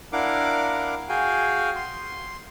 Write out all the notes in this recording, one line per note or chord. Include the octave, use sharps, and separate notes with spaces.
D4 E4 A#4 F5 F#5 D6
F#4 G#4 F5 G5 G#5
C6